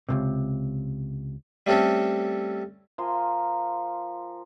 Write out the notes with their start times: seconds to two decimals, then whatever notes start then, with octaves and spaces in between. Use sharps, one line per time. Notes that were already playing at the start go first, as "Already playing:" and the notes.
0.09 C#2 F#2 C3
1.67 G3 A3 C4 C#4 A4
2.98 F3 A#4 G#5 C6